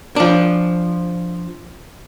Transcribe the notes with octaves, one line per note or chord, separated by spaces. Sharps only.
F3 D4